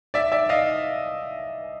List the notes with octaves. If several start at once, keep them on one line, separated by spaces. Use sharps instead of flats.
D5 E5
D5 E5
D#5 F5